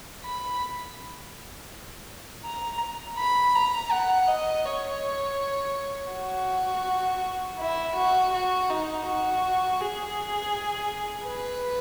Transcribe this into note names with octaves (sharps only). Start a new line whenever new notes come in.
B5
A#5
B5
A#5
F#5
D#5
C#5
F#4
E4
F#4
F#4
D#4
F#4
G#4
B4